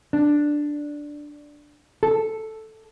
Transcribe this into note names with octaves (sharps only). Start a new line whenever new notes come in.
D4
A4